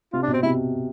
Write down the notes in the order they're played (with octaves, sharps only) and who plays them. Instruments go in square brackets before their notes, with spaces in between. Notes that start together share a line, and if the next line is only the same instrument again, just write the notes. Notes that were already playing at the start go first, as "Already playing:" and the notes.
[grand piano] C3 [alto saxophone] F4
[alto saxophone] D4
[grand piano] B2
[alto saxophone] C4
[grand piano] C3 [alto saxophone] E4